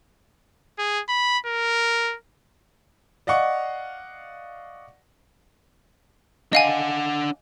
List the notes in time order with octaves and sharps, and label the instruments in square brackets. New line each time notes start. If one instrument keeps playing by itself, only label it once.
[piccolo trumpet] G#4
B5
A#4
[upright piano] D5 D#5 F5 F#5 C#6
[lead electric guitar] D4 F#5 [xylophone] D#5 F5 G#5